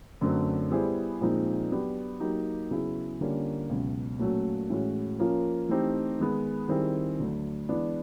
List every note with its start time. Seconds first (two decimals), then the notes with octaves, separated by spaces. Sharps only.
0.21 F#2 D3 F#3 A3 C4
0.71 G3 B3 E4 G#4 C5
1.21 A#2 F3 G#3 C4 D#4
1.71 F#3 B3 D4 G4
2.20 F#3 A#3 D#4 G4
2.71 C#3 F#3 B3 E4 G#4
3.21 D3 G3 A#3 C#4 F4
3.70 C#2 B2 F#3
4.19 A#2 F#3 A3 C#4 F#4
4.70 A2 E3 G#3 C#4 F#4
5.19 F3 A#3 C#4 F4 A#4
5.69 E3 A3 C4 D#4 G4
6.19 D#3 G#3 B3
6.68 D#3 G3 C4 E4 G#4
7.19 D2 D3 F#3
7.69 E3 G#3 B3 D4